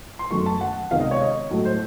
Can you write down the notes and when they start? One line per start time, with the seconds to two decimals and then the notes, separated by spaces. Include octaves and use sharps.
0.19 C6
0.31 F#2 D#3 A3 C#6
0.46 A5
0.61 F#5
0.91 C#2 C3 D#3 F5
1.01 D#5
1.11 C#5
1.21 D#5
1.51 A2 F#3 A3
1.65 C5